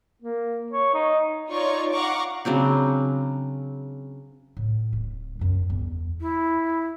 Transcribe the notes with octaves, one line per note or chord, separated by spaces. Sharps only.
A#3
C#5
D#4
D#4 F4 C#5 D5 C#6
F5 F#5 A#5 C#6 D6
C#3 F#3 C4 D4
A2
D1
F#2 A3
E2
E4